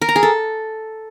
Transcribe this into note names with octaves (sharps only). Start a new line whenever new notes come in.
A#4
A#5
G#4
A4